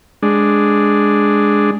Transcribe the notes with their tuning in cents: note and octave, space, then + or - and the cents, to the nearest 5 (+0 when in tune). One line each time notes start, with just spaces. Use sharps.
G#3 +0 D4 +0